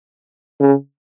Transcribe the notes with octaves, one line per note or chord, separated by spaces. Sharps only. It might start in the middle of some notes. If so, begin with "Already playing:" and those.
C#3